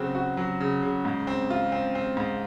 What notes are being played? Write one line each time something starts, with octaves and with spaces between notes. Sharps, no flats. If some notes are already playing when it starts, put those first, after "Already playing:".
Already playing: C#3 F#3 C4 F#4
F#4
F#3
C#3
C#3
G#2
C4
F4
C4
C4
G#2